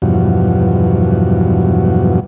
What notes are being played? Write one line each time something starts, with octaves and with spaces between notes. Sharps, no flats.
E2 G2 B2 F3 F#3